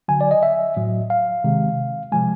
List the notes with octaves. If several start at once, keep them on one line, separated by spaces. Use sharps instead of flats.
D3 F#3 G#5
D5
D#5
E5
A2 F#3
F5
C3 D#3 G#3
C3 F3 G#3 G#5